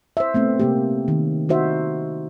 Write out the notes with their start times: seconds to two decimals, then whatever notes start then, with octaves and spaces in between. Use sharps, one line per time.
0.17 C5 E5
0.34 A3 B3 C4
0.60 C3 A#3 G4
1.08 D#3
1.49 D#4 F#4 C5 E5